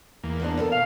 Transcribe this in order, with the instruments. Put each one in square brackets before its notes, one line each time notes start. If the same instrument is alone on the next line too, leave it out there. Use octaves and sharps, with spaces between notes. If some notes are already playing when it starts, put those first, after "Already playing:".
[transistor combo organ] E2 A#3
[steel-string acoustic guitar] G#2 B3 D4
B3 A4 A#4
[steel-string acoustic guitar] B2 [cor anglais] F5